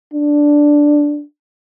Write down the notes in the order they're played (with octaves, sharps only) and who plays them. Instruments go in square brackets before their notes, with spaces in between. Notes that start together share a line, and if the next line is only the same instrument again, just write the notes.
[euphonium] D4